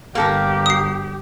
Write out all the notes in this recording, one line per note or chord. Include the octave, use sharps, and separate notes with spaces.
G1 A#3 G4 A4 A#4
D#6 C7